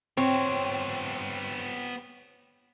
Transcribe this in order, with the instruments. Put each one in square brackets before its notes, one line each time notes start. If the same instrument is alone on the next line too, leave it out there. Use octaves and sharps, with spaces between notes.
[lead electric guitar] B3 G4 [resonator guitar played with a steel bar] C4 [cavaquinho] C#5